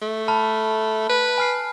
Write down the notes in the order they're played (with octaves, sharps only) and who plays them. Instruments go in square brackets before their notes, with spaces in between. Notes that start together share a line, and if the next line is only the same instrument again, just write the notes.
[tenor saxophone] A3
[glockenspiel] A5 B5 F6
[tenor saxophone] B4
[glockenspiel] G#5 F6 C7